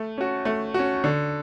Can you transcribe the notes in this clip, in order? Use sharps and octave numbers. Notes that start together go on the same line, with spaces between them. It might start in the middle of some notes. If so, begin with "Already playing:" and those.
Already playing: A3
C#4 F#4
A3
C#4 F#4
D3